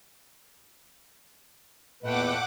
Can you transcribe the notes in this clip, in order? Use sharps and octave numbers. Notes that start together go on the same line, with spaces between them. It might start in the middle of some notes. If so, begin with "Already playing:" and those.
E2 A#2 A3 B4 D#5 F#5 G5 D6